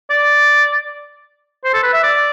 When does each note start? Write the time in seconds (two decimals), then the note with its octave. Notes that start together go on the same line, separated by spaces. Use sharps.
0.10 D5
1.65 C5
1.74 A4
1.83 B4
1.93 E5
2.03 D5